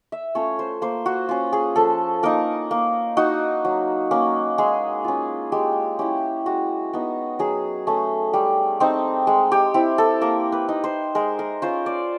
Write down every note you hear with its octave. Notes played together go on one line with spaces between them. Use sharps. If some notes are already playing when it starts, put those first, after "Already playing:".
E5
A3 C#4 F4 C#5
C5
A#3 C5
F#4
C#4 F4
G#4
F3 A4
A#3 D#4 A#4
A#3
D#4 F#4
F#3
A#3 C#4
G#3 G#4
C#4 F4
G#3 G4
C#4 E4 G4
G#3 F#4
B3 D#4
F#3 G#4
A3 C#4
G3
C4 D#4
G#3
G4
C4 E4
A4
A#3 A#4
B4
D#4
C5
G#3 A#4
A#4
C#4 F4 C5
D5